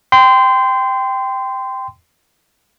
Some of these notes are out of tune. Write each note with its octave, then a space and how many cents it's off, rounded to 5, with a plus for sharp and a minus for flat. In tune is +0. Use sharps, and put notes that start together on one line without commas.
G5 +0 C6 -25